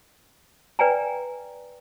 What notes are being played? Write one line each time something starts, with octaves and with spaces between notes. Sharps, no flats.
B4 D5 G5 G#5 A#5